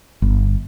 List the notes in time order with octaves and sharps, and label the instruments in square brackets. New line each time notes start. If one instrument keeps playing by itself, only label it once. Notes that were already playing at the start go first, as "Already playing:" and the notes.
[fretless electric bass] G1